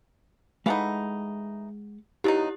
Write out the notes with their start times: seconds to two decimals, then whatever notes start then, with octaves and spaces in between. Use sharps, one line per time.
0.66 E3 G#3 A3 D#4 F5 F#5
2.24 B2 F#3 D#4 E4 G4